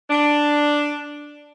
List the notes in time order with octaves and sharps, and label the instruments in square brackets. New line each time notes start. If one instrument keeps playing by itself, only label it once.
[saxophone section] D4